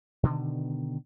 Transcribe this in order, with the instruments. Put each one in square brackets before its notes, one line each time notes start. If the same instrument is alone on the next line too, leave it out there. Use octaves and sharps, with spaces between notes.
[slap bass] B2 D3 D#3